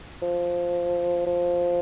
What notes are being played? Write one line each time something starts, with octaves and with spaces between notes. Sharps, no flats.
F3
F3